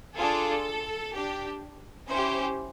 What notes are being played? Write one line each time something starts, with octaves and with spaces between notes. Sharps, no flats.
D4 F4 G#4 A4
D4 G4
C#4 E4 G4 C5